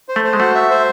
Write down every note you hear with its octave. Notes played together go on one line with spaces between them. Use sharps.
C5
A3
C5
G#3
A3 F#4
E5
C5